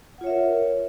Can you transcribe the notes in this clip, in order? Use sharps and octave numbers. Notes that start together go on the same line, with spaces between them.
F4 A#4 C#5 E5 F#5